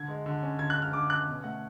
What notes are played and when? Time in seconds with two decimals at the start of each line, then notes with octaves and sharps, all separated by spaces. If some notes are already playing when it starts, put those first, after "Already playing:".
Already playing: D3 G#6
0.08 G#3
0.26 D3
0.43 C#4
0.59 D3 G#6
0.70 F#6
0.76 G#3
0.82 F6
0.93 D3 D6
1.10 C#4 F#6
1.27 B2
1.44 A3 F#5